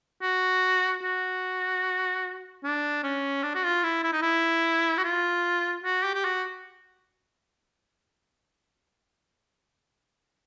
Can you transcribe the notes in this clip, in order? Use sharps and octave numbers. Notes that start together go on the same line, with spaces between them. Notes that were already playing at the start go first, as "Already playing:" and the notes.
F#4
F#4
D4
C#4
D4
F#4
F4
E4
E4
D#4
E4
F#4
F4
F#4
G4
G4
F#4